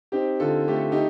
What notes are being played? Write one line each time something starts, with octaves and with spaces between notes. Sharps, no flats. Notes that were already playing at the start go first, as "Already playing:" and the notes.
C4 D#4 G4
D3 F4 A4
A3 G4
A4
D#4 G4